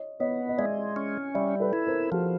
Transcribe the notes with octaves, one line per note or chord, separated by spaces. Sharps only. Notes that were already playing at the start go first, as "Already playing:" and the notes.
Already playing: C#5 D#5
B3 C#5 D#5
D#5
G#3 D5 E5
C#4
G3 D5 E5
A4 B4
E4
A#4 C5
F3 F#4 G#4